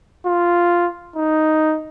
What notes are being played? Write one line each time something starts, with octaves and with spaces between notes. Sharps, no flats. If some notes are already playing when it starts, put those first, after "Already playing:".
F4
D#4